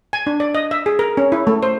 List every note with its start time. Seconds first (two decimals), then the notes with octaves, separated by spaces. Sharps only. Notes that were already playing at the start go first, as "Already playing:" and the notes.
0.13 G#5
0.27 D4
0.40 D5
0.55 D#5
0.71 E5
0.86 G#4
0.99 A#4
1.17 C#4
1.32 E4
1.47 A3
1.63 C5